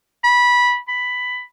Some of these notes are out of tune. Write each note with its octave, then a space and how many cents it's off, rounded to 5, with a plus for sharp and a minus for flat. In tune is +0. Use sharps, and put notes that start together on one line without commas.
B5 -15
B5 +10